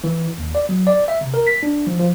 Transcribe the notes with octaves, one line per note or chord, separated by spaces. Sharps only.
E3
D#2
D5
F#3
D5
E5
C3
A#4
B6
D4
F3
F3